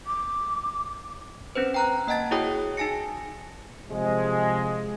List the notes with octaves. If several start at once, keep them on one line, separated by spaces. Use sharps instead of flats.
D6
C4 C#4 B4 C5
G5 A#5 F#6
A#3 D#5 F#5 A5 A6
E4 F#4 G#4 C#5 G5 D#6
D#4 G#5 A5 A#6 C#7
C3 F3 G#3